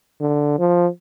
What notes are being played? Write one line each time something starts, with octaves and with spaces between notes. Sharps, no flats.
D3
F3